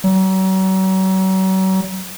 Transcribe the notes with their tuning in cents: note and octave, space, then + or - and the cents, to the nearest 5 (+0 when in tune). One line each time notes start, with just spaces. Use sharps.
F#3 +40